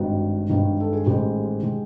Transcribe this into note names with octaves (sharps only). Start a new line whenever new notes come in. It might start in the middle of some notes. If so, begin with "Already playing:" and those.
Already playing: G#1 G2 D#3 F#4
G#1 G2 D#3
A4
G#4
A1 G#2 D#3 G#3 G4
D#3 G#3